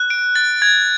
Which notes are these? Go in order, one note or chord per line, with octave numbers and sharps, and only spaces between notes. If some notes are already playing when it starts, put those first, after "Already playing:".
Already playing: F#6
D7
A6
G#6